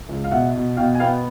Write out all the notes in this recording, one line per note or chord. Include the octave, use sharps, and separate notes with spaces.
C#2
F5
B2 E5 F#5
B2
B2 F5 G5
G#5
B3 F5 G5